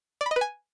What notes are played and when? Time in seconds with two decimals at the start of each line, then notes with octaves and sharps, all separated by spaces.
0.21 D5
0.26 B5
0.31 D#5
0.36 B4
0.41 G#5